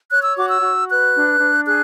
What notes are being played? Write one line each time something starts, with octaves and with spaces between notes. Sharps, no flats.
C#5 F#6
E6
F#4 D6
E6
F#4
B4 F#6
D4
D4
G#4 F#6